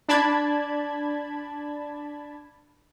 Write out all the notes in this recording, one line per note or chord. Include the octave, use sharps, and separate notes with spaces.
D4 D5 A5 B5 G#6